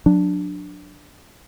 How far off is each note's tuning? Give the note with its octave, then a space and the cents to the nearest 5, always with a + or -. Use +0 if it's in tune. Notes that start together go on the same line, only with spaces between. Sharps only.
F#3 -30 D4 +0